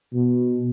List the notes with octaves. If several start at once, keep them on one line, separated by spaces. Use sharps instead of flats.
B2